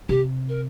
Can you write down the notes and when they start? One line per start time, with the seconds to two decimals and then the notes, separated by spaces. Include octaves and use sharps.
0.09 C3 G4
0.49 A#4